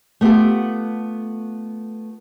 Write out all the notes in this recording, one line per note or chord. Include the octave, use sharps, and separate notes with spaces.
A3 B3 F4 G4 A4